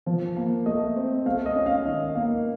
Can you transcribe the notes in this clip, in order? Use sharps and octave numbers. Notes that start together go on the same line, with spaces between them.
F3
A#3
A3 D#5
C4
A3 F5
D#5
C#4
F5
D#3 D#5
A#3 F5